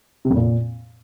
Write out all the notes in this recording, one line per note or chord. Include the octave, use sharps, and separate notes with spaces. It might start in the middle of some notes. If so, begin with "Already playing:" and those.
C3
F2
A#2